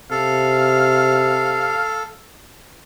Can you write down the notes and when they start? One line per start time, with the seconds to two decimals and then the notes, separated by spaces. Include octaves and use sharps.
0.11 C3 A4 F5